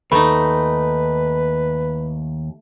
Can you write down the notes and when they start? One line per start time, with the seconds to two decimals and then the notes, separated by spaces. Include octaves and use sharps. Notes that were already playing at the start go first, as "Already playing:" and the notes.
0.12 D#2 A3 D#4 B4 B5